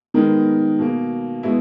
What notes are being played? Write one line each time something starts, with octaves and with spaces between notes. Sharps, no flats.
D#3 G#3 B3 A#4
B2 A#3
B2 G#3 B3 E4